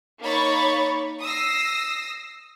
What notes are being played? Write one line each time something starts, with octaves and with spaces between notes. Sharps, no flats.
A#3 D#4 C#5 B5 C#6 A6
D#6 E6 A#6 C7